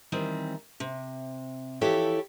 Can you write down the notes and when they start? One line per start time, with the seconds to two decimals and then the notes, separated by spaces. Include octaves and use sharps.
0.12 D#3 E3 G3 C4
0.80 C3
1.81 E3 F3 E4 G4 A4 C#5